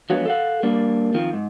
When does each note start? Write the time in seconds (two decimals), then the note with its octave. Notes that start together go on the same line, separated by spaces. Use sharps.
0.10 F3 F#3 G#3 B3 D4 F#4
0.26 A4 F5 F#5
0.63 G3 A#3 D4
1.14 D#3 F3 C4
1.33 G#2